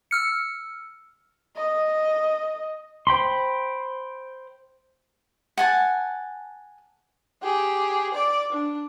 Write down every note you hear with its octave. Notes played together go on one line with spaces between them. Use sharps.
E6 F6 C#7
D#5
C5 G5 B5 C6
F#5 G#5 A5
G4 G#4
D5 D6
D4